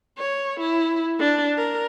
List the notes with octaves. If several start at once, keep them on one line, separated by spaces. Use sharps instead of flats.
C#5
E4
D4
A#4